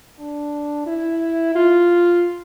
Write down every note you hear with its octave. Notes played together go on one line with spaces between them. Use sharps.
D4
E4
F4